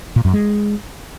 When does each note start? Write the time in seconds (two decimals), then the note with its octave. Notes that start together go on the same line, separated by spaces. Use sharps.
0.16 A#2
0.25 F#2
0.33 G#3